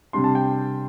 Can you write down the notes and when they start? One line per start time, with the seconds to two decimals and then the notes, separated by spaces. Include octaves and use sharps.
0.13 C3 G3 D4 C6
0.24 A5
0.35 G5